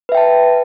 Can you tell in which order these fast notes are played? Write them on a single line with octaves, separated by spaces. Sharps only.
B4 E5 G5 A5